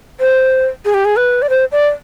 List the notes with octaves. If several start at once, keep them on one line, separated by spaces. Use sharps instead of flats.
C5
G#4
G4
G#4
B4
D5
C5
D5